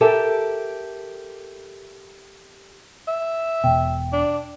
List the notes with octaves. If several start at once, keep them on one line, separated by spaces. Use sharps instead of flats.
G4 A4 A#4 E5 G#5 A5
E5
E1 B2 G5
D4